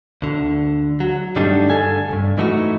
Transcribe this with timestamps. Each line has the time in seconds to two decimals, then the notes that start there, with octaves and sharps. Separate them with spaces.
0.22 D2 D3
1.00 F#3
1.36 G2 D3 G3 A3 D4 D#4
1.70 G2 D3 A4 G#5
2.09 B1 G2
2.37 G#2 E3 A3 D#4 F#4